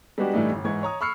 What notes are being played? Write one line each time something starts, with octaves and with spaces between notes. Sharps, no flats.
G3 G#3 B3 D4 F#4 G4
A2 E3 G3 A3 D4 D#4
G1
G#2 E3 C#6 G#6
C#5 A#5 D#6
B5 C#6 E6 F6 C7 C#7